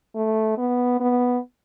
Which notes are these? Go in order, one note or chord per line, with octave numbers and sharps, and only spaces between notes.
A3
B3
B3